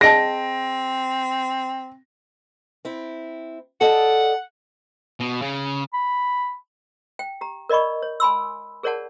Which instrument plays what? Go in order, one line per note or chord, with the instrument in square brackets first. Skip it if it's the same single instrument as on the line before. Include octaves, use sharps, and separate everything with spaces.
[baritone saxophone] C4 [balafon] G#4 D#5 A5 [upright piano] A#6 D7
[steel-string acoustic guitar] C4 E4
[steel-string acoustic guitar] A4 D5 D#5 [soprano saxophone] F#5
[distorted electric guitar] B2
C#3
[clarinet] B5
[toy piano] G5
G4 A#5
A#4 D5 D#5 B5 C#6
C#5
G#5 B5 C6 E6
G#4 A#4 C#5 D5 F#5 A5